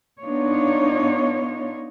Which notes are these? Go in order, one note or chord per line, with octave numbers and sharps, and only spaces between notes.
B3 D4 D#4 F4 C#5